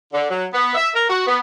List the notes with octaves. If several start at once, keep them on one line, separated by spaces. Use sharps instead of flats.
D3
F#3
B3
E5
A#4
F#4
B3